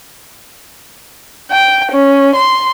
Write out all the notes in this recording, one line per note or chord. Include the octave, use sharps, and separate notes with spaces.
G5
C#4
C6